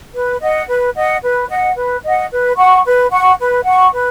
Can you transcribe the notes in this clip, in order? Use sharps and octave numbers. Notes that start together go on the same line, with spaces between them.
B4
D#5 F#5
B4
D#5 F#5
B4
D#5 F#5
B4
D#5 F#5
B4
F#5 C#6
B4
F#5 C#6
B4
F#5 C#6
B4